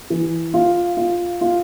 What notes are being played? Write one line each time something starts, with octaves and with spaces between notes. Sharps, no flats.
E3
F4
F4
F4